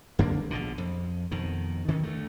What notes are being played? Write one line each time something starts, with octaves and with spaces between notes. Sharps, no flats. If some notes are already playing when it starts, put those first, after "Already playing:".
F#2 D3 A#3 D4
A#1 B2 D3
F2
F2 B2 D#3
D#3 E3 C#4
D2 F#3 A3